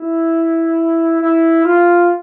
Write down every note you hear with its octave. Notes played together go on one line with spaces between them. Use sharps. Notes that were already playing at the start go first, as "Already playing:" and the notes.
Already playing: E4
E4
F4